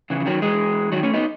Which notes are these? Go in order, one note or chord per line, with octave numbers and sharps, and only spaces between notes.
C#3 E3
E3
D#3 F#3
E3 G#3
D#3 F#3
A3 C#4
B3 D#4